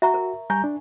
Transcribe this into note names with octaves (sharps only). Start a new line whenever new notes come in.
F#4 E5 A#5 C#6
A#4
G3 G#5 A#5 C#6 G6
D4